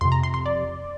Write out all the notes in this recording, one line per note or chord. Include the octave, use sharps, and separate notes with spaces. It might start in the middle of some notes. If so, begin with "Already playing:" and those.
F2 C3 C6
A#5
C6
C6
D5